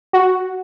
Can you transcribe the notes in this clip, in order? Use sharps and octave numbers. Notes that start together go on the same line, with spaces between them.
F#4